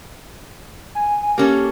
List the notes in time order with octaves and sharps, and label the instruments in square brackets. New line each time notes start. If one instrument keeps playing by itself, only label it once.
[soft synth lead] G#5
G#5
[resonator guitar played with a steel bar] A#3 C#4 A4 [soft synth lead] G4